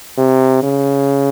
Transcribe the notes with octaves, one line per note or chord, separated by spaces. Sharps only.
C3
C#3